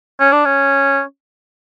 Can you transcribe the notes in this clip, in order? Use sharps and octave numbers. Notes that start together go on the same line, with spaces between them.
C#4
D4
C#4